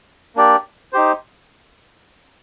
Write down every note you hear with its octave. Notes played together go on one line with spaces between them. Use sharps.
A#3 D4 G4 D5
D#4 G4 C5